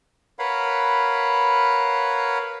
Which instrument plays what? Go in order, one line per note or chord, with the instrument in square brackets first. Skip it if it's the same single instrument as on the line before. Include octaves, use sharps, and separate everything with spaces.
[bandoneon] A#4 B4 C#5 F5 F#5 B5